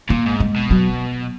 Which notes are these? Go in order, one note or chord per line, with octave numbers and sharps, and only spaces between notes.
A#2 A#3
G#2
G#3
B2
F#3